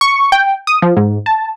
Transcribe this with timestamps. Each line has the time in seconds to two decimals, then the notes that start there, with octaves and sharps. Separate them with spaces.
0.01 C#6
0.32 G5
0.67 D#6
0.82 F3
0.97 G#2
1.26 A5